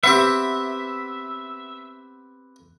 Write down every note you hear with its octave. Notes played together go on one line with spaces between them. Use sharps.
B3 C4 G4 E5